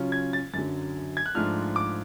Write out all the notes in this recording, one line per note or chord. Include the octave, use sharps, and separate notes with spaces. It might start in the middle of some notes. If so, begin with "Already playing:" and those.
Already playing: C#3 F#3 C#4 F4
G#6
A6
F#2 D3 F#3 A6
G#6
F#6
G#2 F3 A3 D4 F4 F6
D6